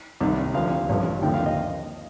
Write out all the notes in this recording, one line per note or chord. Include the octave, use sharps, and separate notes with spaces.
C2 C3 D#3
D2 C3 F3 F5
A1 G2 F3
D#2 D3 F3 G5
F5
D#5